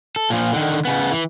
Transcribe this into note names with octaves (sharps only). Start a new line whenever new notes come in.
A4
A#2 F3
D3 D#3
C#3 B3
E3